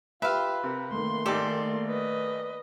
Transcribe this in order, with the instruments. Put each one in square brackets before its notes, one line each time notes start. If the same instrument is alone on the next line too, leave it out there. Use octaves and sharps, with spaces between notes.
[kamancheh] F4 G4 [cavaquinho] B4 F5 [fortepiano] E5
[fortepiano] C3 [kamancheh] A#4
[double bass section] D#3 A3 A#3 [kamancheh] C6
[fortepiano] G#1 G4 [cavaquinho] A4 D5
[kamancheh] B4 D#5